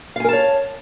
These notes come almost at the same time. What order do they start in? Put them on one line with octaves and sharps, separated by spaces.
F5 G#5 A#4 A5 C#5